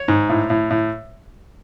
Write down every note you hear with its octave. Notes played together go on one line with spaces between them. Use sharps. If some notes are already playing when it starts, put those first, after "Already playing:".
Already playing: C#5
G#2
A2
A2
A2